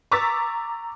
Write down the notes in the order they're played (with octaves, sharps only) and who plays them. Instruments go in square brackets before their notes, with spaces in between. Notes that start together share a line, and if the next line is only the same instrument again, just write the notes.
[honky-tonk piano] A#5 C#6 D6 E6 A6 B6